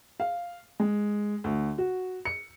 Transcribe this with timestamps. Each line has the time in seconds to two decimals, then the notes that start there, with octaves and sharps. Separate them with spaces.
0.20 F5
0.80 G#3
1.44 D2
1.78 F#4
2.25 C#7